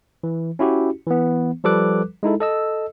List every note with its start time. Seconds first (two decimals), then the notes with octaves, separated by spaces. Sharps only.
0.24 E3
0.59 C#4 E4 F#4 G4
1.07 E3 B3
1.64 F3 G3 A4 B4 D6 F#6
2.23 G#3 D#4 E4 A4
2.40 A4 D#5 E6